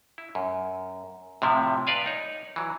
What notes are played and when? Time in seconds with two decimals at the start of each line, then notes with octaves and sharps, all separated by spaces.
0.18 E4
0.35 F#2
1.42 A2 C3 F3 E4
1.87 B4 D5 F5 G#5
2.06 D#4 C#5
2.56 E3 F#3